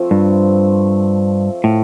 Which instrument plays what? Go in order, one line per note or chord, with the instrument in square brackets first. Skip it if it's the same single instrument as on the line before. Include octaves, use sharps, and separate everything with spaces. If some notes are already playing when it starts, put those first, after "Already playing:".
Already playing: [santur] F3 A3 C4
[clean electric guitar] G2
A2